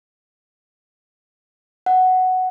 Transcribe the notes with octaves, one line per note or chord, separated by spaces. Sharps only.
F#5